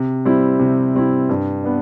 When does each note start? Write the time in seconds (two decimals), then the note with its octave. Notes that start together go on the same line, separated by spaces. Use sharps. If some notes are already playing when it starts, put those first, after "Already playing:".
Already playing: C3
0.25 G3 C4 E4
0.59 C3
0.95 G3 C4 E4
1.29 G2
1.64 B3 D4